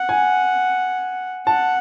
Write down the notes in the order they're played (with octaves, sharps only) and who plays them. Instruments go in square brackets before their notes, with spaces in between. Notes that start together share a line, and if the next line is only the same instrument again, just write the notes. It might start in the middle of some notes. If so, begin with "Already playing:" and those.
Already playing: [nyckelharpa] F#5
[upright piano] G#5
[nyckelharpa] F#5 [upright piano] A5